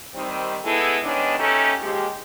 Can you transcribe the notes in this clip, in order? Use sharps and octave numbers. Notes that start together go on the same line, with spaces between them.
D#3 G3 C4
G#3 A3 B3 E4 G#4 A4
D#3 G#3 B3 C#4 D4
D#2 A3 C#4 D#4 G4 A4
D#2 F3 G#3 G4